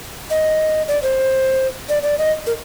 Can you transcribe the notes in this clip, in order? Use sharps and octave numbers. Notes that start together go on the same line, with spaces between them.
D#5
D5
C5
D5
D5
D#5
A#4